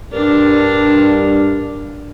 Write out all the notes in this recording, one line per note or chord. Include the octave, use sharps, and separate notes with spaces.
G2 D4 A#4